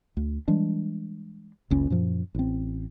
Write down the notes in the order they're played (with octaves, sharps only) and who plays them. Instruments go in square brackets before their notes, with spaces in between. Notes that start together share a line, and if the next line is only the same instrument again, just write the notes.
[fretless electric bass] D2
E3 G3 G#3 D4
F#1 C#2 C#4
F#2 A#2 F3
A1 C4